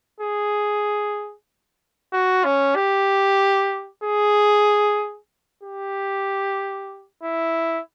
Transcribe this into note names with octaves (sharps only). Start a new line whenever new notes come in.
G#4
F#4
C#4
G4
G#4
G4
E4